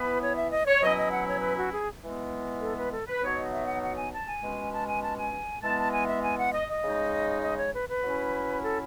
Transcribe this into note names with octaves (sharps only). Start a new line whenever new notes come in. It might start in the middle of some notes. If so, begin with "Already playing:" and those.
Already playing: E3 B3 E4 B4
C#5
E5
D#5
C#5
B2 F#3 C#4 E4 D#5
D#5
F#5
C#5
B4
F#4
G#4
E3 G#3 B3
A4
B4
A4
B4
B2 F#3 B3 D#4 C#5
D#5
E5
F#5
F#5
G#5
A5
G#5
B2 G#3 C#4
A5
G#5
A5
G#5
E3 G#3 B3 A5
A5
G#5
E5
G#5
F#5
D#5
D#5
C#3 G#3 D#4
D#5
C#5
B4
B4
F#3 C#4 E4
A4